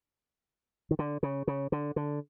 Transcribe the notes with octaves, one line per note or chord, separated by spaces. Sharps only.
D#3
D3
C#3
C#3
D3
D3